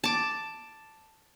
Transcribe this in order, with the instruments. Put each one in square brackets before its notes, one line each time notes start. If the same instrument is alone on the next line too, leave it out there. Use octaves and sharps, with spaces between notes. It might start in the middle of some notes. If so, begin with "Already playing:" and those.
[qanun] A5 D6